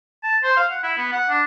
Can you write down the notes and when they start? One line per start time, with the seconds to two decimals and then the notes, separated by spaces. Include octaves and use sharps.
0.23 A5
0.43 C5
0.57 F5
0.71 F#5
0.83 E4
0.98 B3
1.12 F#5
1.29 D4